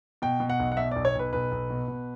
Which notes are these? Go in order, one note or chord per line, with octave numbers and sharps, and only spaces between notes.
B2 G5
B2
F#5
B1
F#5
B2 E5
B1 D5
C#5
B1 B4
B1 B4
B1
B2
B2